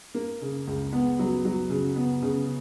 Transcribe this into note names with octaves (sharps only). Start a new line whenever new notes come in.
A#3
C#3
C#2
B3
F#3
F#3
C#3
B3
C#3